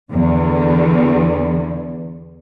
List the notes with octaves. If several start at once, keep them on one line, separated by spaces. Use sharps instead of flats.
E2 D3